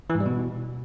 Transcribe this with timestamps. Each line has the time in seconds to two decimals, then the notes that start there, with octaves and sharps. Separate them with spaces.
0.10 E3
0.15 G#2
0.20 G3
0.26 B2